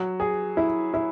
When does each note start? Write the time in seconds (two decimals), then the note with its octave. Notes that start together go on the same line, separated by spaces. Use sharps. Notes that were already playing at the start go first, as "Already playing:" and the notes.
Already playing: F#3
0.20 G#4
0.57 E4
0.94 E4